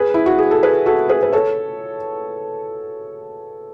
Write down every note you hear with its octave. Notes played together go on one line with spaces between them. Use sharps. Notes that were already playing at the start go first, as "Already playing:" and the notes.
Already playing: G#4 B4
E4
F#4
G#4
A4
G#4 B4
F#4 A4
G#4 B4
B4
A4 C#5